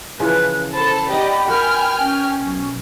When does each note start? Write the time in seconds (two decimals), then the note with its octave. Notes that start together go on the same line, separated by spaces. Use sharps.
0.20 C#3 E3 F3 B4
0.73 A4 C5 A5 B5
1.09 B3 D#4 G4 D5 D#5
1.48 F#4 A#4 B4 G5 G#5 F6
1.99 C#4
2.41 B1